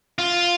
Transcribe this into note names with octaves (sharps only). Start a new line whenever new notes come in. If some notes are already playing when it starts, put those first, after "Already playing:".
F4